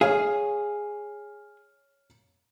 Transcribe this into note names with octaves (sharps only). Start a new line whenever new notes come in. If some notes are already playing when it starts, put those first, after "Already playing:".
G#4 C#5 F5